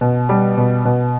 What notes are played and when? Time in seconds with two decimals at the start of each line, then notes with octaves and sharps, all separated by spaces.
0.01 B2
0.29 G3
0.57 B2
0.85 B2